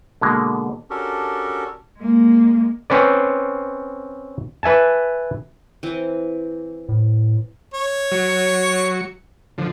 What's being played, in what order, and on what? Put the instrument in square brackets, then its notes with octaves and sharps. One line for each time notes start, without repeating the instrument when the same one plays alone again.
[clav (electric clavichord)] B2 D3 G#3 A#3
[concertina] C#4 D4 F#4 G4 A4 A#4
[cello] G#3 A#3
[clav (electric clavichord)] C4 C#4 B4 D5
B4 E5 G#5 A5
[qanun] E3 C4
[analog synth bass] A2
[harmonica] C#5
[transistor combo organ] F#3 C#6
D3 F3